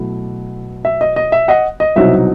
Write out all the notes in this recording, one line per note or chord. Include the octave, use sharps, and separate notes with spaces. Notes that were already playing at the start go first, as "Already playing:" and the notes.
Already playing: B2 F#3 A3 E4
E5
D#5
D#5
E5
D#5 F#5
D#5
C2 B2 F#3 C4 D#4 E5